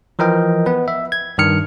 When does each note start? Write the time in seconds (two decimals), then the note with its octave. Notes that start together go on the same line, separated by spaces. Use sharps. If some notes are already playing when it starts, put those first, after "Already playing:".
0.19 E3 F3 A#4 D#5 G5
0.66 B3 B4
0.88 E5
1.12 G#6
1.38 G2 D#3 F6 C#7